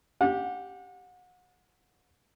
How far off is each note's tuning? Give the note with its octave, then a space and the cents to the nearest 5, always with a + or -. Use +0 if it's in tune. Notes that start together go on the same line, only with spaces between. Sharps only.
G4 -5 F#5 -35